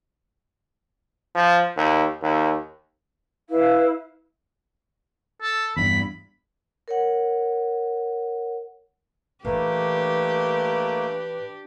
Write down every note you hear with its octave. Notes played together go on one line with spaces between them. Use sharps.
F3
D#2
D#2
E4 B4 F5
A4
E2 G2 B5
A#4 C#5 F#5
A#2 E3 A3 A#3 D4 G4 B4